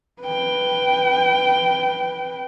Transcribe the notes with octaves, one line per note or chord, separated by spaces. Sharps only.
B4 G5